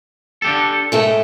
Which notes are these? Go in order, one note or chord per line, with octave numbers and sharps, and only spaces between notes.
D4 G4 A4
A2 G#3 A3 A4